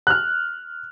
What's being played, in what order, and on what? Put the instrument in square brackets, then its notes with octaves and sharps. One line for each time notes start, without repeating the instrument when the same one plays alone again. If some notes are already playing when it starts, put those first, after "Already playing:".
[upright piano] F6 F#6